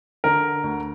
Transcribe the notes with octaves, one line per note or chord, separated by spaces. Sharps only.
D3 A#4
D2